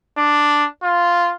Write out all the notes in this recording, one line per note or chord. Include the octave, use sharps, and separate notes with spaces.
D4
F4